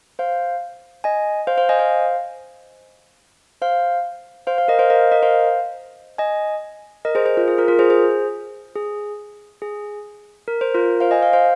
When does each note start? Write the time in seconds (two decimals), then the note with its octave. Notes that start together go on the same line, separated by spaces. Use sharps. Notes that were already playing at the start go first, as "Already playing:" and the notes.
0.19 C5 F5
1.04 D#5 G#5
1.47 C5 F5
1.58 C5 F5
1.69 D#5 G#5
1.79 C5 F5
3.62 C5 F5
4.47 C5 F5
4.58 C5 F5
4.68 A#4 D#5
4.79 C5 F5
4.90 A#4 D#5
5.11 A#4 D#5
5.22 C5 F5
6.18 D#5 G#5
7.05 A#4 D#5
7.15 G#4 C5
7.26 G#4 C5
7.37 F4 A#4
7.48 G#4
7.58 F4 A#4
7.68 F4 A#4
7.79 G#4 C5
7.90 G#4 C5
8.76 G#4
9.62 G#4
10.48 A#4
10.61 C5
10.75 F4 A#4
11.00 C5 F5
11.11 D#5 G#5
11.23 C5 F5
11.33 C5 F5